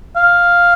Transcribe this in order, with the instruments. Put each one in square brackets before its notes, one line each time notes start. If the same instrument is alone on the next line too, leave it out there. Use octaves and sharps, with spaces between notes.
[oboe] F5